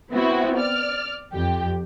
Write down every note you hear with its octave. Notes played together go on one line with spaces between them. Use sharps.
B3 C4 E4 F#4
D5 F6
F2 G4